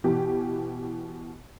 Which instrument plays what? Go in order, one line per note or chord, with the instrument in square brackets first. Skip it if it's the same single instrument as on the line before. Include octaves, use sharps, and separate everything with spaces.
[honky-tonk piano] B2 E3 G4